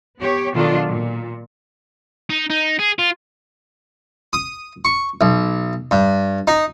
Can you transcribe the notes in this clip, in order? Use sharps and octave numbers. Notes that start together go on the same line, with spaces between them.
B3 G4 C#5
B2 D#3 F#3 D4 F4 A4
A#2
D#4
D#4
G#4
F4
D#6
C#6
B1
G2
D#4